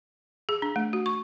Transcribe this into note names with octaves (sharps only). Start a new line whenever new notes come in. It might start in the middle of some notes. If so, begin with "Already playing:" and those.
G#4
D4
A3
F#4
C#6